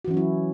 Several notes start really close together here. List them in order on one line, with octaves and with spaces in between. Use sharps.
F#4 E3 C#4 F#3 E4